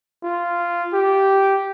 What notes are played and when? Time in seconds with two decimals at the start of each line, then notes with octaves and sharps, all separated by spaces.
0.24 F4
0.94 G4